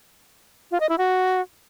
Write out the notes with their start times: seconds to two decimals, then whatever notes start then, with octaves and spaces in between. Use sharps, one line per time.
0.71 F4
0.80 D#5
0.89 E4
0.98 F#4